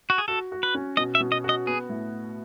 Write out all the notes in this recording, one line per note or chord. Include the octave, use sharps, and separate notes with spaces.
F#4
G#4
F#4 A4
F#4
B4
C#4
B2 D#5
E5
B2
D#5
F#4 D#5
B3 G#4
A2